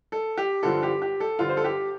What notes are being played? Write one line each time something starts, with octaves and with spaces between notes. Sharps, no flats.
A4
G4
G2 D3 F3 A4
G4
G4
A4
G2 D3 F3 F4
C5
A4
G4